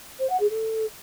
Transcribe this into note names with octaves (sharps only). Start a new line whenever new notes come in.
C5
F#5
G#4
A4